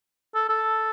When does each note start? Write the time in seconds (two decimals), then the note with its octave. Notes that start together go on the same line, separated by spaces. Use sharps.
0.35 A4
0.49 A4